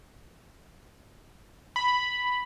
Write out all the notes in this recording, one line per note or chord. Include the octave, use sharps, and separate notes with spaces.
B5